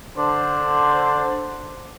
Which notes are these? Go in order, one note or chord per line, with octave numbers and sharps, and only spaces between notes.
D3 D4 C5